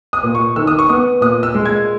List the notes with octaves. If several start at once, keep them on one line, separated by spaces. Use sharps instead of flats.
D#6
A#2
C#6
D#3 E6
D#6
C#6
B3 D#6
A#2 D#6
E6
G#3
G#6